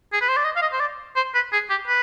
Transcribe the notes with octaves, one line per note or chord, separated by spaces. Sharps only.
G#4
B4
C5
D5
D#5
F5
D#5
C5
D5
C5
B4
G#4
G4
B4